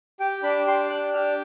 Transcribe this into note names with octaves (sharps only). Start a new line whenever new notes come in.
G4 G5
D4 B5
G4 C6
D4 F#6
G4 F6